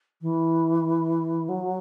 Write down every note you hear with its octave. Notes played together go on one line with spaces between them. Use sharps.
E3
F#3